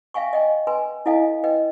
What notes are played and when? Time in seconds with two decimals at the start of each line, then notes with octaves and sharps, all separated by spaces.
0.14 E5 F5 G5 G#5 C#6
0.33 D#5 G5 G#5
0.67 B4 G#5 C6
1.06 E4 A4 D#5 F5 G#5
1.44 B4 D#5 G5